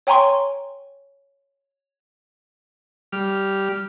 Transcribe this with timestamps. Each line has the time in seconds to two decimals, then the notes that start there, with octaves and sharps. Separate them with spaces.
0.07 C#5 G5 G#5 A#5 C6 C#6
3.12 G3 F6